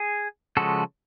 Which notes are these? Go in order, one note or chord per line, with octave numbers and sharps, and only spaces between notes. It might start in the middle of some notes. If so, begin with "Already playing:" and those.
Already playing: G#4
C#3 F3 G#3 F#4 A4